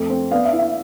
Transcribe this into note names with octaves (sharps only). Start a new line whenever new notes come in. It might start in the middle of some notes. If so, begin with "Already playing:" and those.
Already playing: F2 A3
C4
B3 D5 F5
E5
E4
E5